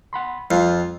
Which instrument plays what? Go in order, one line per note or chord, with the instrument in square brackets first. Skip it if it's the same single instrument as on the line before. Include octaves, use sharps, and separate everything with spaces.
[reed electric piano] F#5 B5 C6
[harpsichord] F2 [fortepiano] F4 [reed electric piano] G5